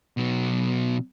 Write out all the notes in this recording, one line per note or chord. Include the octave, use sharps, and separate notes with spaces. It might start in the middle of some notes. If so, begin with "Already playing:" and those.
B2 F#3